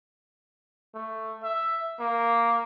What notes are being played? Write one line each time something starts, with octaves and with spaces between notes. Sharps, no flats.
A3
E5
A#3